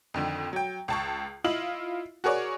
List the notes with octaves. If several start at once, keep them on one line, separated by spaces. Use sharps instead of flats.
F2 D3 D#3
F#3 G5
C#2 A5 C#6
E4 F4 D#5 F#7
F#4 G#4 A#4 C#5 D5